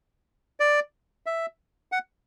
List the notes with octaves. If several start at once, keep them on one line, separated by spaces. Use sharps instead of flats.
D5
E5
F#5